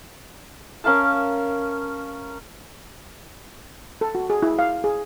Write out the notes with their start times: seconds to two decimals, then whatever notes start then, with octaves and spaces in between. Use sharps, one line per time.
0.84 C#4 A#4 F5 A5
4.01 A4
4.15 F#4
4.30 G#4
4.42 E4
4.59 F5
4.84 G#4